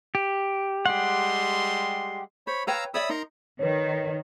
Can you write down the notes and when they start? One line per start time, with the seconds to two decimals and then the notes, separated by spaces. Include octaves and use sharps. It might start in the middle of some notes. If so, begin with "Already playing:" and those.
0.15 G4
0.86 G3 G#3 G4 F#5 C6
2.47 C5 C#5 B5
2.67 B4 C#5 F5 G5 A#5 E6
2.94 C#5 D5 E5 B5 D#6 E6
3.09 D#4 A#4 A#5 C6
3.59 D#3 B4 C#5